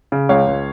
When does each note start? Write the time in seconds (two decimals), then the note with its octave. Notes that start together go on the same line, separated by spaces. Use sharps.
0.12 C#3
0.29 C#2 C#5 F5
0.47 C#2